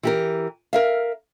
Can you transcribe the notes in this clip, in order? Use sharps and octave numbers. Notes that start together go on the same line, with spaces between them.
E3 G4 A#4
A#4 E5 F5